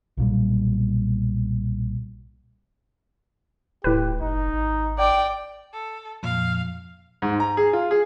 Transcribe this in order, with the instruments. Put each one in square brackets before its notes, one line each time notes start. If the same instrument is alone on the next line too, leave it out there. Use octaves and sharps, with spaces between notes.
[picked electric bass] B1 A#2 G3
[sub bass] D1 [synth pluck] A2 B4 [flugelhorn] G4
[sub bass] F#1 [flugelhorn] D#4
[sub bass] G#1
[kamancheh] D5 G5
[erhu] A4
[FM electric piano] F2 A#2 F3 [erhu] F5
[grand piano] G#2
A#5
G#4
F4
G#4